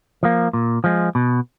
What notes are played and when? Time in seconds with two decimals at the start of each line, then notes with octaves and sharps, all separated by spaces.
0.23 F3 A#3
0.53 A#2
0.84 F3 G#3
1.15 B2